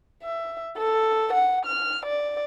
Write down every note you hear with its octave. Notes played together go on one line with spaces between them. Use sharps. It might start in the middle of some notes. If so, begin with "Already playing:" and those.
E5
A4
F#5
F6
D5